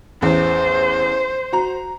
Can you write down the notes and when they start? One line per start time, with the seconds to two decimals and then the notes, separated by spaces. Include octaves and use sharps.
0.22 A1 E2 C5
1.53 F#4 A#5